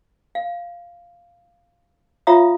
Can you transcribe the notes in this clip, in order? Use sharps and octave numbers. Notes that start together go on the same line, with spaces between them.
F5
F4 C#5 E5 F5 A#5 D#6